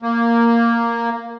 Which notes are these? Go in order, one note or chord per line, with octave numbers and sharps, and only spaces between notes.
A#3